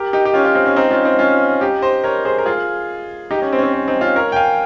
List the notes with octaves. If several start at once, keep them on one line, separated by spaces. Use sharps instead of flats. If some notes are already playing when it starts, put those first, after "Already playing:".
Already playing: G4 A#4
D#4 G4
G4
C#4 F4
C#4 F4
C4 D#4
C#4
C4 D#4
C#4 F4
C4 D#4
C#4 F4
D#4 G4
C5 D#5
A#4 C#5
G#4 C5
A#4
F4 G#4
D#4 G4
C#4
C4
C#4
C4
C#4
C4 D#4
C#4 F4
A#4 C#5
G5
F5 G#5